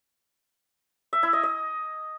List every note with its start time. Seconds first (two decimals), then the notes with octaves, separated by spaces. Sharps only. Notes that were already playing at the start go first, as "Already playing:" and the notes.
1.13 E5
1.23 E4
1.33 D#5
1.43 D#5